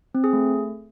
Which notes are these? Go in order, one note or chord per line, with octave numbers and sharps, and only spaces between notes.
C4
G#4
A3